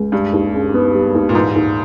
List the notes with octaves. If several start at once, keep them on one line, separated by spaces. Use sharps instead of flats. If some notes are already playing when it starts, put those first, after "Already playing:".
Already playing: C#2
G2 G3
D#2
C#3
B3
G3
D#2
A#2
G#2 E3
D#2